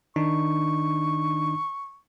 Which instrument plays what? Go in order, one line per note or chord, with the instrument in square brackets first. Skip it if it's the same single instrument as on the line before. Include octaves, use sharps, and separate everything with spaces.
[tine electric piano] D#3 D4 D#4 [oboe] C#6